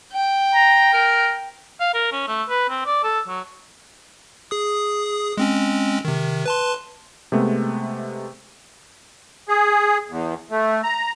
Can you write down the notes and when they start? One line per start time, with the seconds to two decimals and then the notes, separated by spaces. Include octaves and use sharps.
0.12 G5
0.54 A#5
0.93 A#4
1.80 F5
1.94 A#4
2.12 C#4
2.27 A3
2.49 B4
2.70 C4
2.86 D5
3.03 A4
3.28 F#3
4.51 G#4 D#6
5.37 G#3 C4 C#4
6.05 C3 D#3
6.46 B4 A5 C6
7.32 C3 G#3 A3 B3
9.49 G#4
10.10 E2
10.50 A3
10.84 A#5